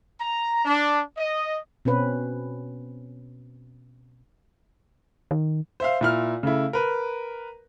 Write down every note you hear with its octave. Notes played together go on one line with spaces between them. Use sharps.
A#5
D4
D#5
B2 C4 C#4 B4
D#3
C5 E5 F5
A#2 E4 F6
C#3 A3 E4
A#4 B4